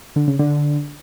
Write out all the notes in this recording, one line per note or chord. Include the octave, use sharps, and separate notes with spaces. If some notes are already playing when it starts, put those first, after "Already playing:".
D3
C#3
D3